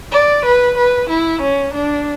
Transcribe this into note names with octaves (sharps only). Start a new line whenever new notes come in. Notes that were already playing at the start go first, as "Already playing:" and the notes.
D5
B4
B4
E4
C#4
D4